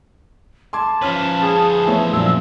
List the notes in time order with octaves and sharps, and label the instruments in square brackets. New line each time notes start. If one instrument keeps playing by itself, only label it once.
[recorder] A5 [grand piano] C6 D6 G#6
[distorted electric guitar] F3 B4 [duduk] C#4 [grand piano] C#5 F6
[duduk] G#4
[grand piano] E3 B3 C#5 [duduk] A3
[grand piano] A#1 F#2 G3 [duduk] A#2 [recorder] E6